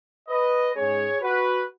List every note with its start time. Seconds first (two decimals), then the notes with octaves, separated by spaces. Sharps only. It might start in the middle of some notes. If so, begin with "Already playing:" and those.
0.29 B4 D#5
0.76 G#2 G#3 C#4 G#4 C#5
1.21 F#4 B4